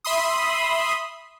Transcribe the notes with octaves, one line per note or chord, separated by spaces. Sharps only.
E5 B5 C6 D#6